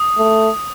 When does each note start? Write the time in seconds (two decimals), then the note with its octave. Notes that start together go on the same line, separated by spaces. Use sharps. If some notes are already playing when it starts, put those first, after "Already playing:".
Already playing: D#6
0.18 A3